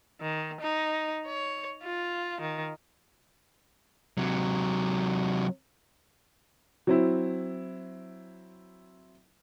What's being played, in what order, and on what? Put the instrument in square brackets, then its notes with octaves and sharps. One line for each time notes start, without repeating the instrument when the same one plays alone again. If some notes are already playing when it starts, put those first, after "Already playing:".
[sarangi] D#3
D#4
C#5
F4
D#3
[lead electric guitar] C3 F#3
[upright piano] F#3 C4 E4